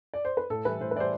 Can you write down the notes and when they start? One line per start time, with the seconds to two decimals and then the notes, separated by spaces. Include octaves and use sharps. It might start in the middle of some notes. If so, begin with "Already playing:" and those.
0.14 D5
0.25 C5
0.37 B4
0.50 A2 A4
0.65 E3 G3 B4
0.81 A2 C5
0.91 B4
0.96 E3 D5
1.00 G3 C5